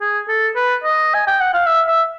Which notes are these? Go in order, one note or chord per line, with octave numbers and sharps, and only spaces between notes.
G#4
A4
B4
D#5
G#5
G5
F#5
F5
E5
E5